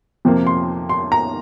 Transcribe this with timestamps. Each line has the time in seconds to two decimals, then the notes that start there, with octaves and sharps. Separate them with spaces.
0.25 F2 C3 F3 A#3
0.47 C6
0.89 C6
1.12 A#5